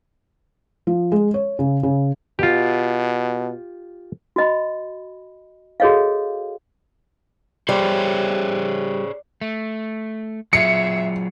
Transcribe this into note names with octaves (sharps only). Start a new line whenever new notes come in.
F3
G#3
C#5
C#3
C#3
B2 F4 G4
F#4 D#5 B5
F#4 G#4 A4 C#5 D#5 F5
G3 G#4 C5 C#5
A3
F#3 F4 G#4 E5 C#7